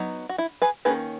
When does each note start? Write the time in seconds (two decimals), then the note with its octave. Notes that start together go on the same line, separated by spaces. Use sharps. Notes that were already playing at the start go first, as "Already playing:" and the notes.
Already playing: F#3 B3 D#4
0.29 F#4
0.38 E4
0.62 G#4 B4
0.85 D#3 A#3 C#4 G#4 B4